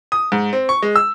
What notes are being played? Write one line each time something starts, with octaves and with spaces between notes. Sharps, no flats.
D#6
G#2
C4
C#6
G#3
E6